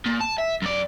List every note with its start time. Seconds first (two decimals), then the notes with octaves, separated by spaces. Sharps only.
0.06 A#2
0.21 A5
0.38 E5
0.62 F#2 D5